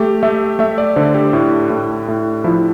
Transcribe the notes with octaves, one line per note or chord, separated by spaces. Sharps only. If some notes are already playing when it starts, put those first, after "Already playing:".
Already playing: A3 G4
A3 E5
A3 E5
D5
D3 C5
G4
A2
A2
A2
F3 E4